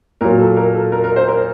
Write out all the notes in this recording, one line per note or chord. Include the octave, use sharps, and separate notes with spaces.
A#2 F#3 A#4
A4
A#4
A4
A#4
A#4
C5
A#4